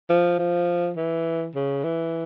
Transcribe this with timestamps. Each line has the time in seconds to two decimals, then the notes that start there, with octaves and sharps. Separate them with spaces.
0.10 F3
0.39 F3
0.97 E3
1.55 C#3
1.84 E3